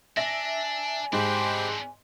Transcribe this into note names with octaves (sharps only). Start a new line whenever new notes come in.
D4 E5 G#5 A#6
G#2 C4 D4 G4 C5 B5